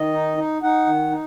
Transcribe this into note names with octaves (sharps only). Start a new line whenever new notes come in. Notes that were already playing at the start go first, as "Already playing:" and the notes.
Already playing: D#3 D#5
D#4
D#4
D#4 F#5
D#3
D#4